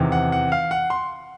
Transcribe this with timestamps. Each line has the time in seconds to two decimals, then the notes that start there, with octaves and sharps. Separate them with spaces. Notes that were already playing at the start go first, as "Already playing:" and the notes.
Already playing: E2 C3 D#3
0.12 F#5
0.32 F#5
0.52 F5
0.71 F#5
0.90 C6